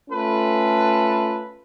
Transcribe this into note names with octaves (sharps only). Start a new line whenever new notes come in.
A3 C#4 F4 A4 B4